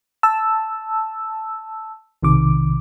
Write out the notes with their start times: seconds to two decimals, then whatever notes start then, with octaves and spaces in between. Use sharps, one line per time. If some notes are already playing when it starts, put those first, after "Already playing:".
0.23 A5 E6
2.22 B1 C3 D#3 D6